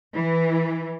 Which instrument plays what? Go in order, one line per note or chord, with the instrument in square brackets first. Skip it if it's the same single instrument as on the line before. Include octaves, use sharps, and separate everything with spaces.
[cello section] E3